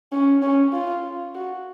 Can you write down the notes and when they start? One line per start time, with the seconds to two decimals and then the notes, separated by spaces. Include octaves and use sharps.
0.12 C#4
0.42 C#4
0.72 F4
1.35 F#4